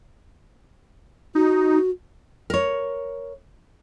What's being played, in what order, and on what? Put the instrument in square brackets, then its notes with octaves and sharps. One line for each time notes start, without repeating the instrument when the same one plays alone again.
[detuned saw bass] D#4 [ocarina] F#4
[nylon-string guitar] A#4 C#5